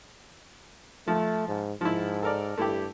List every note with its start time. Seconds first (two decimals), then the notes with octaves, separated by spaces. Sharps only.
1.08 F3 A3
1.48 G#2
1.81 G#2 F3 E4
2.23 A4 A#4 D5
2.57 G2 A3 E4 G4